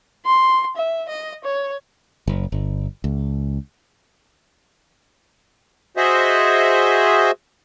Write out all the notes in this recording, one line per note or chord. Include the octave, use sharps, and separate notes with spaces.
C6
E5
D#5
C#5
F#1
G1
C#2
F#4 G#4 C5 D#5 E5